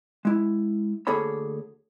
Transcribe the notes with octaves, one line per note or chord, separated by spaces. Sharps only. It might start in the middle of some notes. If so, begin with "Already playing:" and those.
G#3 E4
D2 A#3 G#4 A4 C#5 B5